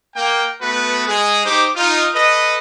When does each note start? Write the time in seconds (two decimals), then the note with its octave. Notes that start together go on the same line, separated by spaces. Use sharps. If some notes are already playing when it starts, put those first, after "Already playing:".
0.15 A#3 G5
0.61 A3 B3 F#4 B4
1.08 G#3 G#4
1.44 D#4 G4 C5 D6
1.76 D#4 F4
2.14 A4 B4 D#5